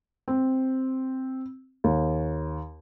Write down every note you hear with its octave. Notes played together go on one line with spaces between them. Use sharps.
C4
D#2